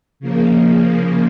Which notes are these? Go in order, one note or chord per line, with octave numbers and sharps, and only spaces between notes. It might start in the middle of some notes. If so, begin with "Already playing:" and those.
C#3 F3 A#3